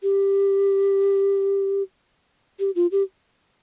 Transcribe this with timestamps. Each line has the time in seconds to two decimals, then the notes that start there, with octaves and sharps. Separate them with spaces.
0.03 G4
2.59 G4
2.75 F4
2.92 G4